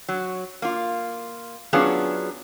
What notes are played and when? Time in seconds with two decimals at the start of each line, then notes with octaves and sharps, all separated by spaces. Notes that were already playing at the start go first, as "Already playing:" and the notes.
0.09 F#3
0.62 A#3 F4
1.73 F#3 B3 C#4 D4 F4 G#4